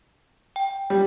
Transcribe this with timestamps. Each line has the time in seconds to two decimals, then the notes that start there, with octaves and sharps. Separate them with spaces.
0.56 G5
0.90 G3